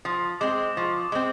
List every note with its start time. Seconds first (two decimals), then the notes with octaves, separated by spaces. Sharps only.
0.05 F3 D#6
0.41 G#3 C4 D6
0.77 F3 C#6
1.12 G#3 C4